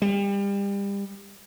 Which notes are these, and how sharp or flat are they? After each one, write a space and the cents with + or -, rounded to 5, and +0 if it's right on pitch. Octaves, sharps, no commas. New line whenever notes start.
G3 +30